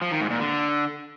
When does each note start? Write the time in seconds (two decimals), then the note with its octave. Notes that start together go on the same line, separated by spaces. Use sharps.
0.02 F3
0.11 D#3
0.21 G#2
0.30 A#2
0.40 D3